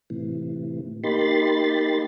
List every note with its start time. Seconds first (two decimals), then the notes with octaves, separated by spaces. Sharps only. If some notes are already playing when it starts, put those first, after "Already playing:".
0.10 A2 C3 E3
1.04 A#3 D#4 G4 B5 C6 A6